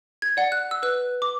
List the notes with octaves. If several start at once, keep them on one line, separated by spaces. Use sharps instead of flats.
G#6
D5 F#5
F#6
E6
B4 F#6
D6